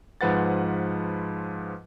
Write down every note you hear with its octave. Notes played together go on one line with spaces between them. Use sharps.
G#2 F3 B4 F#5 A6